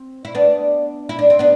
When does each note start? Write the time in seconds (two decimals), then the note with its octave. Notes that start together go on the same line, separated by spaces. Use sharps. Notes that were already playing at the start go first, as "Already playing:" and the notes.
Already playing: C4
0.25 E4
0.35 B3 D4
1.09 E4
1.19 D4
1.30 C4
1.39 B3 D4